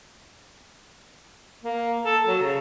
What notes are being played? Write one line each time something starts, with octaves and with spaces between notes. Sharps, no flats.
A#3
A4
F#3
C#3